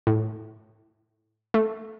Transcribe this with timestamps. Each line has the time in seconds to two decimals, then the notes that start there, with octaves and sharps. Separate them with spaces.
0.07 A2
1.54 A3